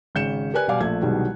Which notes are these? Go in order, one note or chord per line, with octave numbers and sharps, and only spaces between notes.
G#1 C#3 G6 C#7 E7
G4 A#4 B4 D5 G#5 F#6
B2 G3 D5 F5 G#5 D6
A#1 F3 A3 G#6
C2 B2 D#3 F#3 G#3 G4